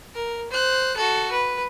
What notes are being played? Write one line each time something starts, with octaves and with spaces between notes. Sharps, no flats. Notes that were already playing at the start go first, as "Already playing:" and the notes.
A#4
C5 F#6
F#4 A4
B4